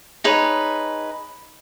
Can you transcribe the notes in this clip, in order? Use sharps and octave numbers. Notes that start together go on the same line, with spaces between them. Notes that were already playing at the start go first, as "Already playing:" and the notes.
D#4 G#4 B4 C#5